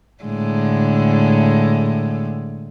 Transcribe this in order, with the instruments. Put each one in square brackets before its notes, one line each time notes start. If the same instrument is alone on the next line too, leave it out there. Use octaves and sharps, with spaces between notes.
[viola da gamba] A2 D3 G#3